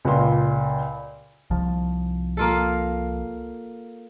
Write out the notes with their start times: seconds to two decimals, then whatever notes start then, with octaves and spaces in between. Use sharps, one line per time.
0.05 C#2 A#2 C6
1.50 C2 F3
2.37 A#3 F4 A4